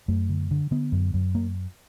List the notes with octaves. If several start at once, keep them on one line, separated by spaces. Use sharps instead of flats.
F#2 A3
D3
D3
D3 B3
F#2
F#2
A#3